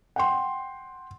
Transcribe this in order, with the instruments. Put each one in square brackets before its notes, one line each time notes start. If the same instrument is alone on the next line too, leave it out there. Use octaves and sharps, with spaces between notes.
[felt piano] F#5 G5 C6